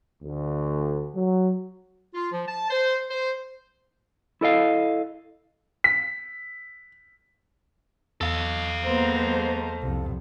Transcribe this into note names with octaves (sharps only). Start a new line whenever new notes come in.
D2
F#3
F4
F3
A5
C5
C5
E4 A4 D#5 F5
B6
E2 A4 F5
G#3 A#3 B3 C5 A#5
C2 F2